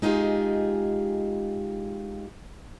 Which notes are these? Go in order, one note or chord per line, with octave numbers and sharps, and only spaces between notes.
G#3 D#4 F4 G4 G#4